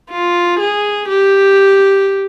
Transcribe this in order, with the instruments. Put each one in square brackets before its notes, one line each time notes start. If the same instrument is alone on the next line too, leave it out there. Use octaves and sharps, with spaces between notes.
[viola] F4
G#4
G4